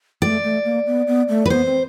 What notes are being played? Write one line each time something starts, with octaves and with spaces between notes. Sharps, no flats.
A3 D5
A3
A#3
B3
B3
A3
B4
B3 C5
C4